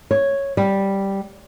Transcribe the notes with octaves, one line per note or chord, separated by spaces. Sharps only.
C#5
G3